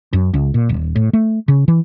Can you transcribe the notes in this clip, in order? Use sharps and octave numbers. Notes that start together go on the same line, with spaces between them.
F#2
C#2
A#2
D#1
A2
A3
C#3
E3